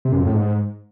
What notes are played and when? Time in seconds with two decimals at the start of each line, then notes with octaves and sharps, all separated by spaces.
0.05 C3
0.12 F#2
0.19 F2
0.27 A2
0.34 G#2